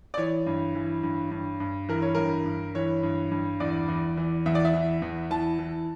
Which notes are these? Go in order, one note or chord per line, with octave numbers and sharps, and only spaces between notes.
D5
E3 C#5
G2
E3
G2
G2
G2
E3 A#4
C#5
G2 A#4
G2
E3 C#5
G2
G2
E2 D5
E2
E3
E2 E5
D5
E5
E3
E2
E3 A5
E3